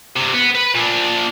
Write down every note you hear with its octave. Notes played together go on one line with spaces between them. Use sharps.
G2 C3
B3
B4 B5
A#2 D4